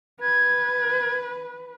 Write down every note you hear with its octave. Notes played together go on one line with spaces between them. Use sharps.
B4 G#6